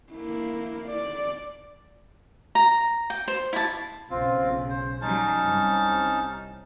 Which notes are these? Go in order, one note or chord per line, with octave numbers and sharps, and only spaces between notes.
A#3 E4
D5
A#5
G5
C5
E4 A5
B1 C#3 C4 F4
C5
F#3 G3 C#4 D#4 A5
C2